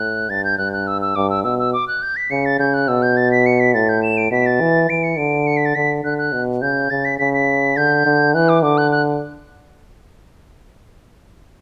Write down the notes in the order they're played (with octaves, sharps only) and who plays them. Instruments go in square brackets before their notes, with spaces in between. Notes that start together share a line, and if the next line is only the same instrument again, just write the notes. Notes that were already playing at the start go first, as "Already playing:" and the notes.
Already playing: [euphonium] A2 [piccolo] F#6
[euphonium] G2 [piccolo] A6
[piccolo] G6
[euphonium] G2 [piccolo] F#6
[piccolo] F#6
E6
E6
[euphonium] G2 [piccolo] D6
[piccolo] E6
[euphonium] B2 [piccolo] E6
[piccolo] E6
D6
F#6
G6
B6
[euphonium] C#3 [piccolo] C#7
[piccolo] A6
[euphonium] C#3 [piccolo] G6
[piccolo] F#6
[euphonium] B2 [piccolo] E6
[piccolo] G6
A6
B6
C#7
B6
[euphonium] A2 [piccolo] A6
[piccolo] G6
E7
D7
[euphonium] B2 [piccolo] B6
[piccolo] A6
[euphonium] E3
[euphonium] E3 [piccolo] D7
[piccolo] C#7
[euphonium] D3 [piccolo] D7
[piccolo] C#7
B6
A6
[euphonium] D3 [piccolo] B6
[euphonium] D3 [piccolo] F#6
[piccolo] F#6
[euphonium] B2
[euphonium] C#3 [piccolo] G6
[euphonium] C#3 [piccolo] A6
[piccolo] B6
[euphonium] C#3 [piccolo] B6
[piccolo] B6
[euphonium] D3 [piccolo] G6
[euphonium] D3
[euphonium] E3 [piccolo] F#6
[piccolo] D6
[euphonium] D3 [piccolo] D6
[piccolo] F#6
F#6